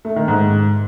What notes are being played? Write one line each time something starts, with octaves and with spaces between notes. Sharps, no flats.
A3
D#3
G#2